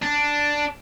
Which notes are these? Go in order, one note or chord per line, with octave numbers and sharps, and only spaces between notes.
D4